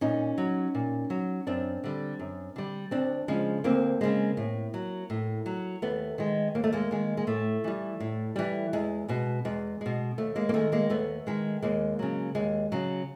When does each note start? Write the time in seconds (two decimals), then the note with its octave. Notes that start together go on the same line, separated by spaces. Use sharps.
0.01 A#2 C#4 D#4
0.38 F#3
0.75 A#2
1.10 F#3
1.47 F#2 C4 D4
1.84 D3 G3
2.19 F#2
2.56 D3 G3
2.91 D2 C4 D4
3.28 C#3 F3 G#3
3.64 D2 A#3 C4
4.01 C#3 F3 G#3
4.37 A2
4.74 F#3
5.10 A2
5.46 F#3
5.82 D#2 A3 B3
6.18 D#3 G#3
6.55 D#2 A#3
6.64 A3
6.72 G#3 A#3
6.91 D#3 G#3
7.17 G#3
7.27 A2 A3
7.64 E3 G3
8.00 A2
8.36 E3 G3
8.73 E2 G#3
9.08 B2 G#3
9.45 E2 G#3
9.81 B2 G#3
10.18 D#2 A3
10.36 G#3 A#3
10.49 A#3
10.54 D#3 G#3 A3
10.72 G#3 A#3
10.90 D#2 A3 B3
11.27 D#3 G#3
11.62 D#2 G#3 A#3
11.99 C#3 F#3
12.35 D#2 G#3
12.72 C#3 F#3